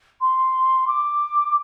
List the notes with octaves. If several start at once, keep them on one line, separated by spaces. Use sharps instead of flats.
C6
D6